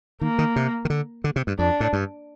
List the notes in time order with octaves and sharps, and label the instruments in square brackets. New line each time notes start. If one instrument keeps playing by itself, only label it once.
[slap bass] D#3 [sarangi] A#3
[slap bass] D#3
C3
D#3
D3
D3
C3
G2
[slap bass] F2 [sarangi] D4
[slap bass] A2
G2